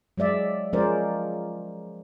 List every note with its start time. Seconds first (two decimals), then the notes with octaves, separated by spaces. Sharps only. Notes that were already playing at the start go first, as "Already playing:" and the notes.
0.17 F#3 G#3 D5 E5
0.73 F3 G#3 C#4 A#4 C5 D5